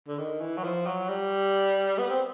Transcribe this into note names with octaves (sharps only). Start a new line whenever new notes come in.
D3
D#3
E3
F#3
F3
F#3
G3
B3
C4